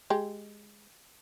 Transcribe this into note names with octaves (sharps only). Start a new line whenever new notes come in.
G#3 G4